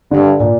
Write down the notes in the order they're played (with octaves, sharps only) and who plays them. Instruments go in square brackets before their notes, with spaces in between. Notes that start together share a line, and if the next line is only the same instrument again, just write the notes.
[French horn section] G2 [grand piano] D3
[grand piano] A#2